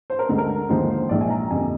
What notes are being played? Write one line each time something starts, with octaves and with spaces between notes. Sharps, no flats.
C5
A#4
D2 D3 G#3
A#4
D#2 D3 F3 G#3 C5
C5
A#1 G#2 F3 G#3 D5
G#5
A#5
F2 D3 G3 A#3 G#5